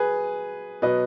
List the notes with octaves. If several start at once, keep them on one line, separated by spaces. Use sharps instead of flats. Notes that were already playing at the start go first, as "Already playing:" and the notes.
Already playing: F#3 G#4 B4
B2 F#3 B4 D#5